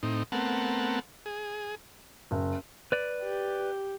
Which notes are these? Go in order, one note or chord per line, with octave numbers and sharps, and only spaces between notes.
A2 C4 D#4
A3 B3 C4 A#4 F#5 A5
G#4
F#1
B4 D5
G4